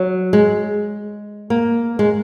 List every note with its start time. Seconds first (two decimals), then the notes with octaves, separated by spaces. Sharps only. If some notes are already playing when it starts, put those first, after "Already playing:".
Already playing: F#3
0.33 G#3
1.50 A#3
1.99 G#3